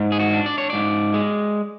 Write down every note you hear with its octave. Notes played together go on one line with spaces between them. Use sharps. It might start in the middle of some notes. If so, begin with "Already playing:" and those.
Already playing: G#2
G#4
F#4
D4
D5
C#5
G#2 D5
G#3